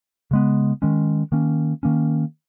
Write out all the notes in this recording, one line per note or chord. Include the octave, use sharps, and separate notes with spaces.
C#3 G#3 B3
D#3 G#3 C#4
D#3 A#3 C#4
D#3 A#3 C#4